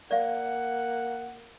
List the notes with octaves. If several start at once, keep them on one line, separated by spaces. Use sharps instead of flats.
A#3 D5 F5 F#5